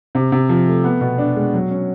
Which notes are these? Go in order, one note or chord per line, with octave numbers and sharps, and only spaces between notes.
C3
C3
F3
A3
B3
B2
D4
G#3
F#3
C#4